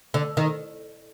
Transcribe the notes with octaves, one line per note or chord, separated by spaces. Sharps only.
D3
D#3